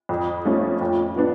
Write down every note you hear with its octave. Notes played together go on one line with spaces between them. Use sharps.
F2
F3 A3 C#4
F2
F3 B3 D4